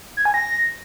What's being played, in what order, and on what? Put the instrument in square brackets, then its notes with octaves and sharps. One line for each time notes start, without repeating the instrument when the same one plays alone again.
[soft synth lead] G#6
G#5
A#6